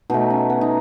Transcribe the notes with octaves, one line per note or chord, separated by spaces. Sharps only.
B2 A3 D#4
C#4
B3
D#4